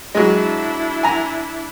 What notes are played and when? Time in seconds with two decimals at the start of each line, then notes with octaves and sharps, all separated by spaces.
0.15 F#3 G#3 D4 E4
1.03 G#5 A#5